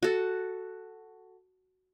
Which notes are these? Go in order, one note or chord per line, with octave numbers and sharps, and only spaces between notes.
F#4 A4